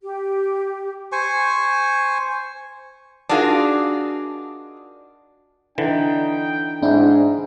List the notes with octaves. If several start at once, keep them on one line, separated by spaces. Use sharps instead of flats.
G4
C5 G#5 C#6
D4 D#4 F4 F#4 G#4 A#4
D3 E3 D#4 G5
G#2 D4 E4